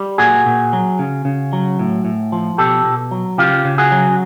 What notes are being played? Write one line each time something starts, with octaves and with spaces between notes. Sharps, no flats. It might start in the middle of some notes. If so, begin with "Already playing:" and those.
Already playing: G3
A#2 F#4 G#4
A#2
F#3
C#3
C#3
F#3
A2
A2
F3
B2 G4 A4
B2
F#3
C#3 F4 G4
C#3
F#4 G#4
F#3